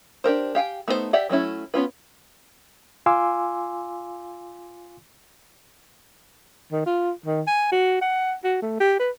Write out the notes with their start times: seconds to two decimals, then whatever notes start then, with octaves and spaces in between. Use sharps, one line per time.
0.24 D4 G4 A#4 C5
0.55 G4 F5 G5 G#5
0.88 A3 B3 D#4 F#4 C5
1.13 G4 D5 E5 F#5
1.29 F#3 A3 C#4 E4
1.74 B3 C#4 F4 B4
3.06 F4 F5 G#5 C6 D6 E6
6.72 D#3
6.86 F4
7.26 D#3
7.47 G#5
7.72 F#4
8.01 F#5
8.44 F#4
8.62 A3
8.80 G4
8.99 B4